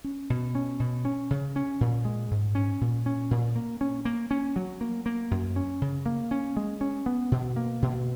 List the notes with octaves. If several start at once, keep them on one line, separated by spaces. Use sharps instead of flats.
C#4
B2
C#4
B2
C#4
C#3
C#4
A#2
G#3
G#2
C#4
A#2
C#4
A#2
A#3
C#4
A#3
C#4
F#3
A#3
A#3
F#2
C#4
C#3
A#3
C#4
G#3
C#4
B3
B2
A#3
B2